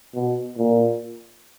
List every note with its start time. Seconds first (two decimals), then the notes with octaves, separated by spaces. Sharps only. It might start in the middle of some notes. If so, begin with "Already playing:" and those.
0.15 B2
0.58 A#2